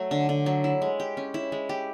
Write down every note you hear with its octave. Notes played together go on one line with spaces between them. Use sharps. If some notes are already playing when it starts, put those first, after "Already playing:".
Already playing: F#3 A3
D3
D3
F#3
E4
G#3
G4
C#4
E4
G#3
G4